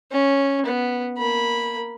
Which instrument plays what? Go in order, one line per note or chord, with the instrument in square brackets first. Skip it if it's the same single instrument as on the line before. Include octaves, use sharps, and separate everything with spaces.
[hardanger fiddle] C#4
B3
A#3 B5